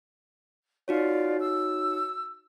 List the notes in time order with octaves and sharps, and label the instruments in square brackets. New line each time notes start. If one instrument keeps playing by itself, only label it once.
[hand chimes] D#4 F#4 C#5 [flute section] F4 D5
[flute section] E6